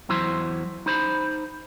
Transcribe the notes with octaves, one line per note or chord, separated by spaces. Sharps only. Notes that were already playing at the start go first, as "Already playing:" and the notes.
E2 F#3 E4 C5 C6
D#4 C5 B5